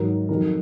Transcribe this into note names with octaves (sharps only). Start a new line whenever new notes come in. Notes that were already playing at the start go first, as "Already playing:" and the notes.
Already playing: G#2 D#3 F#3 A#4
F2 D#3 F#3 A#4